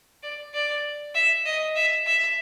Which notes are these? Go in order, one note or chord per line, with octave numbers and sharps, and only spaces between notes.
D5
D5
E5
D#5
E5
E5